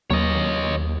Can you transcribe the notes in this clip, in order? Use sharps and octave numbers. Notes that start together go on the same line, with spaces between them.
D#2 F#3 A#3 C#5 D#5